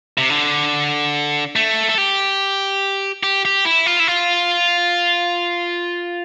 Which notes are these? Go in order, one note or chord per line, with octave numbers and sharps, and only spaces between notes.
C3
D3
A3
A4
G4
G4
G4
E4
F4
E4
F4